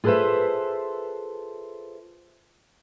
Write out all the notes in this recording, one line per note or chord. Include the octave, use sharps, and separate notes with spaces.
F4 G#4 A4 B4 C5 E5